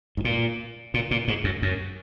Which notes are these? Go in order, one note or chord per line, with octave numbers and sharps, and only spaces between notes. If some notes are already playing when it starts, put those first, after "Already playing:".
G#2
A#2
A#2
A#2
G#2
F#2
F#2